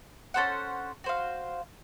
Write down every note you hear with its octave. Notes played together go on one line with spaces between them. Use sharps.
C#4 A4 C5 F#5
F#4 C5 F5